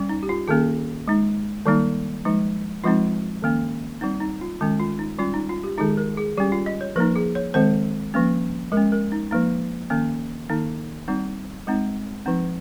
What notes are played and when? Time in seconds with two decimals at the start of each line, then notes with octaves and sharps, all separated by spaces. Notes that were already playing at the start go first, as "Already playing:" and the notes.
Already playing: G3 C#4
0.09 D#4
0.23 G4
0.29 F4
0.48 D#3 A#3 C#4 G#4
1.08 G#3 D#4
1.66 D#3 G3 A#3 D#4
2.25 F3 G#3 D#4
2.84 F3 G#3 C4 D#4 F4
3.42 D#3 A#3 C#4
4.01 G3 C4 D#4
4.20 D#4
4.41 F4
4.61 D#3 G#3 C#4
4.80 F4
4.99 D#4
5.19 G3 C#4 F4
5.34 D#4
5.49 F4
5.64 G4
5.78 D#3 G#3 D#4 G#4
5.97 A#4
6.18 G#4
6.37 G3 C#4 G4
6.52 F4
6.66 D#5
6.81 C#5
6.96 F3 A#3 D#4 A#4
7.16 G#4
7.35 C#5
7.54 D#3 G#3 C4 C5
8.14 F3 A#3 C#4
8.72 G#3 A#4
8.77 C#4
8.92 A#4
9.12 D#4
9.31 F3 A#3 D#4
9.90 D#3 A#3 C#4
10.50 D#3 A#3 D#4
11.08 G3 C4 D#4
11.67 G#3 C4 D#4
12.26 F3 C4 D#4